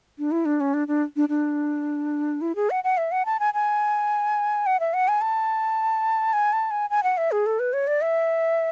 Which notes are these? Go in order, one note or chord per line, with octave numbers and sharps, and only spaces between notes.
D4
E4
D4
C#4
D4
D4
D4
D4
E4
G#4
F#5
F#5
E5
F#5
A5
G#5
G#5
F#5
E5
F#5
G#5
A5
G#5
A5
G#5
G#5
F#5
E5
G#4
A4
B4
C#5
D5
E5